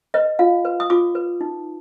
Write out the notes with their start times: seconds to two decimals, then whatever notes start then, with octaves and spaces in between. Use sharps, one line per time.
0.14 B4 D#5
0.39 F4 F5
0.65 B4
0.80 D#6
0.90 F4 D6
1.15 B4
1.41 D#4